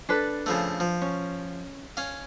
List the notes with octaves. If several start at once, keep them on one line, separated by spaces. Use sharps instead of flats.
D4 A4 B4
C#3 F3 A3
F3
C#4
C#4 F5